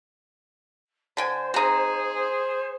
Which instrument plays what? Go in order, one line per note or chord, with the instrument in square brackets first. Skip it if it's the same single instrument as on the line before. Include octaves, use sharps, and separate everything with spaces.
[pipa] D3 G5 G#5 [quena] C5
[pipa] C4 D#4 [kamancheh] G#4
[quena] C5